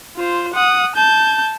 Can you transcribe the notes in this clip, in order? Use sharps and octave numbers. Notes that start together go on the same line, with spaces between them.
F4 C5
F#5 D#6
A5 G6